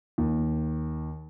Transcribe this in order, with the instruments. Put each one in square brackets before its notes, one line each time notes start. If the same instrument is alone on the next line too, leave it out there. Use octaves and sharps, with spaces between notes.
[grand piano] D#2